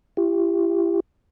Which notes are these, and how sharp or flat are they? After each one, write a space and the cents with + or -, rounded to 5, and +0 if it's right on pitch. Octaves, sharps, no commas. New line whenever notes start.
E4 +40 G4 +10